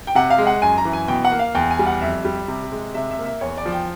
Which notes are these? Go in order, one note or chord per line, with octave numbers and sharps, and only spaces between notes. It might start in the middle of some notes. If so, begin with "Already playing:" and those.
G5
C3 F#5
F5
G#3
F#5
F#2 G#5
A#5
E3
G#5
B2 G5
F#5
A#3
F5
E2 G5
G#5
G3
F#5
F2 E5
G3
C3
G#3
C3 E5
E5
A#3
E5
E2 C#5
D5
F3
G5